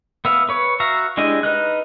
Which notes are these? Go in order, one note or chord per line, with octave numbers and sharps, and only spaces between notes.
B3 E5 F5
B4 C#5
F#4 E5 F5 A#5
G#3 D4 E4 G4 D#5
D#4 B4 D#5 F6 F#6